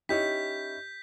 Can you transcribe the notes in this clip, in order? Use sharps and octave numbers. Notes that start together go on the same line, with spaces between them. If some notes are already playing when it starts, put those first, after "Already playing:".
C#4 D#4 E4 G4 G6 B6